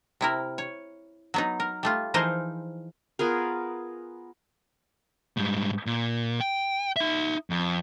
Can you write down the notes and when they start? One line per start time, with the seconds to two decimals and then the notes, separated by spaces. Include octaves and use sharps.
0.21 C3 E4 A#4
0.58 C#5
1.34 F#3 B3 D#4
1.60 A#4
1.83 G3 A3 F4
2.14 E3 F3 D#4 G#4 A#4 C5
3.19 B3 F4 G#4 A#4
5.37 G#2 G3
5.86 A#2
6.40 G5
6.96 D#4 E5
7.50 F2